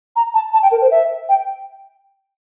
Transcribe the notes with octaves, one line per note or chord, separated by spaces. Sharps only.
A#5
A5
A5
G5
A#4
C5
E5
G5